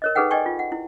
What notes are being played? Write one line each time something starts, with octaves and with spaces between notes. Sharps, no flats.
A#4 C#5 D#5
D#4 G#4 A4 B4 F#5 G5
D5 D#5 G5 G#5 C#6
F4
F#5
E4